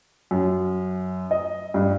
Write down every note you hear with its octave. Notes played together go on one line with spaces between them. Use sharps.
F#2
D#5
G2